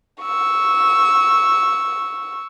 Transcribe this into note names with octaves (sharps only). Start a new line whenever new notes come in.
C#6 E6